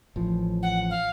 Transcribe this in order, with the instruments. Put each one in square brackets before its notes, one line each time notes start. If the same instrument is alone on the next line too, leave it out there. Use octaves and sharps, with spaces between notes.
[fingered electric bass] A1 F3
[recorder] F#5
F5